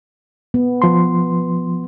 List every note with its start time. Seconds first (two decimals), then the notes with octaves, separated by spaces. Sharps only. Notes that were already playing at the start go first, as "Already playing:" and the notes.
0.54 B3
0.82 F3 C6